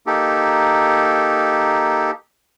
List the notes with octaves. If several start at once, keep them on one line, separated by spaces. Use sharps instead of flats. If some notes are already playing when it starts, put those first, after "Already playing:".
A#3 D#4 G4 A4